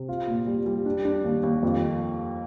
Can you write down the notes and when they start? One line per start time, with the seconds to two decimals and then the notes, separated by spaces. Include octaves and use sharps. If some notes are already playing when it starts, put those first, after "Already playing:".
Already playing: C3
0.09 F4
0.27 A#2
0.47 G3
0.66 G3
0.86 D4
1.05 D4
1.24 D#2
1.43 D#2
1.63 F2